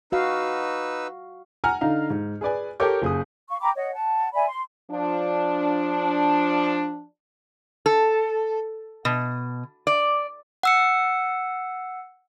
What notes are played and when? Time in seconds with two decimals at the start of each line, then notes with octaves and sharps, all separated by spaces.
0.12 D#4 F#4 B4 F5 E6
1.64 F#5 G#5 A#5 F6
1.81 D3 D#4 F5 A#5
2.10 G#2
2.41 G#4 B4 D5 G#5
2.80 G4 A4 A#4 C#5 D6 G6
3.02 F#1 G#4 D#6
3.50 F5 C#6
3.61 G5 A#5 B5 D6
3.76 C#5 D#5 F#5
3.94 F#5 A5
4.33 D5 E5 G#5 B5
4.48 C6
4.90 F3 D4
7.86 A4
9.05 B2
9.87 D5
10.63 F#5 E6 C#7